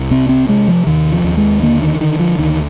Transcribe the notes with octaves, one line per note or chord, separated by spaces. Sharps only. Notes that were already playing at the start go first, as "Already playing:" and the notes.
Already playing: C2
C3 C4
C4
C3 G#3
F3
D#2 D#3
F3
D#2
G#3
D3 A#3
D#3
D3 D#3
F3
D2 D#3